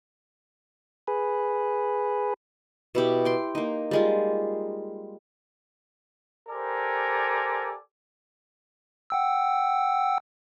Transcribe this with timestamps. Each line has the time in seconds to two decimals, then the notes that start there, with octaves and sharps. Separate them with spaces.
1.08 G#4 B4
2.95 B2 E4 G4
3.25 G5 C6
3.55 A#3 D#4
3.91 G3 G#3 F4
6.49 G4 A4 A#4 C5 D5 G#5
9.10 F#5 G5 E6